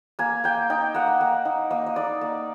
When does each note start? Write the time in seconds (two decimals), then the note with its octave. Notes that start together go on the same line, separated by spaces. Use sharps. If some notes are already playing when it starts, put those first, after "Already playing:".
0.19 A#3 G#5
0.44 A#3 G5
0.70 D#4 G5
0.94 A#3 F#5
1.21 A#3
1.45 D#4
1.70 A#3 D#5
1.86 D#5
1.96 D#4 D5
2.21 A#3